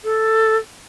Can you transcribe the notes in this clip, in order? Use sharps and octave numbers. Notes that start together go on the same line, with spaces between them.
A4